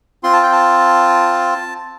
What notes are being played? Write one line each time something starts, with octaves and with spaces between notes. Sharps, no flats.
C4 F4 C6
A5
G5
A5